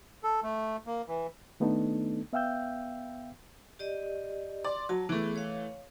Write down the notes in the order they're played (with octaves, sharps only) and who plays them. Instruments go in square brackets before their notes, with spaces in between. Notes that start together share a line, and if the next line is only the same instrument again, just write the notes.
[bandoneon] A4
A3
A#3
E3
[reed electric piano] D#3 A3 B3 D4 D#4 A4
B3 E5 F5 G5 E6 G6
[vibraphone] G4 D5 D#5
[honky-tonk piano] D5 [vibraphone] C6 D6
[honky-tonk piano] F#3 [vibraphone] A5
[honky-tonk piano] E3 A3 [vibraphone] B3 G#4
[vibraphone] C#5 F5